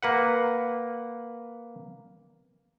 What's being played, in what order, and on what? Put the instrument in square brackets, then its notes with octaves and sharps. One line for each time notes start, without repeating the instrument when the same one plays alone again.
[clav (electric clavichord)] A#3 B4 F#5